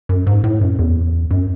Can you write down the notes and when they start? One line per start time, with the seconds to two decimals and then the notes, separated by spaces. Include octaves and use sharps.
0.09 F#2
0.27 G#2
0.44 A2
0.61 F#2
0.79 E2
1.31 F#2